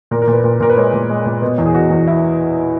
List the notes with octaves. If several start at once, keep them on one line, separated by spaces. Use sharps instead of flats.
A#2 A#4
A#4
A#2
B4
A#2
A#2 A#4
B4
G#3 C#5
A#2
G#3
A#2
B2
E2
G#4
B2 F#4
E2
E4